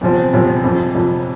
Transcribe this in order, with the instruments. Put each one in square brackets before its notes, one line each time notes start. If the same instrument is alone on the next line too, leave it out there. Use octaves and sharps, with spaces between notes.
[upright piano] E2 C3 F3 C4
E2 C3 F3 C4
F2 C3 F3
F2 C3 F3